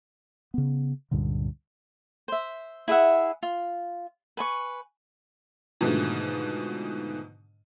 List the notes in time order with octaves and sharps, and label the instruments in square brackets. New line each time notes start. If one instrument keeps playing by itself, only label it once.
[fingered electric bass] C#3 B3
C#2 G2 A#2 D3
[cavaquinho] C5 E5
E4 G#4 E5 F#5
F4
B4 G#5 C#6
[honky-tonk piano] G#2 B2 D3 D#3 F3 A3